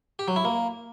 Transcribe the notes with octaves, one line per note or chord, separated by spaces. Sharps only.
G4
F#3
E4
A#3